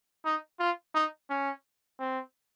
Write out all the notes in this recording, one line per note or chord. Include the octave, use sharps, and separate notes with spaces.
D#4
F4
D#4
C#4
C4